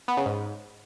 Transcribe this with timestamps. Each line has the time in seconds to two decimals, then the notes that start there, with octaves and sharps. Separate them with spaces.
0.08 B3
0.17 C#3
0.26 G#2